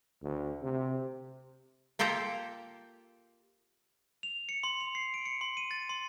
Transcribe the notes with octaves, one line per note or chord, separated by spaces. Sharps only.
D2
C3
A#3 F4 G4 A4 A#5
F7
C#7
C6
F7
C7
D7
C#7
C6
D#7
A6
C6